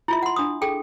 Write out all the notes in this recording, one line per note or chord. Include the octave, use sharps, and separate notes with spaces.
E4 F4 E5
F#5 C6
D4 D#6
G#4 A4 G5